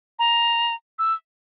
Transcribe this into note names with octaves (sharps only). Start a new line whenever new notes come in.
A#5
E6